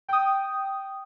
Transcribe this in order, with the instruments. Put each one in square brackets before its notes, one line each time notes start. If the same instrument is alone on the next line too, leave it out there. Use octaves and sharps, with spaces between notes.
[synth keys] G5 D#6